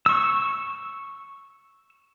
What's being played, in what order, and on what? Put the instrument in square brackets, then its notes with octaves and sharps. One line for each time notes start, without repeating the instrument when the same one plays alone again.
[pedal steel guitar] C#6 E6